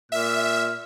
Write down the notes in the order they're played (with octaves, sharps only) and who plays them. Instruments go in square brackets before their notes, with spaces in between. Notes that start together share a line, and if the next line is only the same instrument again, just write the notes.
[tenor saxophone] A#2 [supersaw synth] E5 [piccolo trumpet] F6